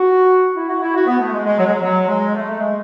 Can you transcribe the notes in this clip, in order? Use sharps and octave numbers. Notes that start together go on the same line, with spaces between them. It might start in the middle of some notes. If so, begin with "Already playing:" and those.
Already playing: F#4
E4
F#4
E4
F#4
B3
A3
G#3
G#3
F#3
G#3
F#3
F#3
G#3
A3
A3
G#3